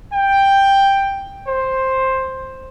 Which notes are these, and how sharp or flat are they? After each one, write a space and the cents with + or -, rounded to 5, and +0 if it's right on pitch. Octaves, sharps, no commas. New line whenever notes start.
G5 +5
C5 +10